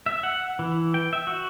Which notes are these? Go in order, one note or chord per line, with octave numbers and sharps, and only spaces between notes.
E5
F#5
E3
G5
E5
F#4